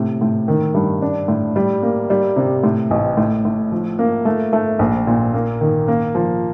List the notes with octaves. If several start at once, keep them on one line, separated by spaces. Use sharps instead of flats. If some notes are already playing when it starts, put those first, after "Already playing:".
Already playing: A2 C3
A2
D#3
G2
D4
A2
G3
A#3
G3
C3
A2
A1
A2
A2
F3
A#3
A3
A3
A#1
A#2
A#3
D#3
A#3
F3